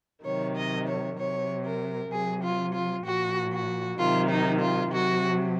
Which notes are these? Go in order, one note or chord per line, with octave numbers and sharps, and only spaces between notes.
C3 D#3 F#3 C#5
D#5
C#5
C3 F#3 C#5
A#4
C3 F#3 G#4
F4
F4
A#2 F3 F#4
F#4
C3 D#3 F#3 F4
D#4
F4
C3 F#3 F#4